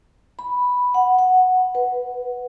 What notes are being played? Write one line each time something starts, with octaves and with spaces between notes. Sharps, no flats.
B5
F#5
F#5
B4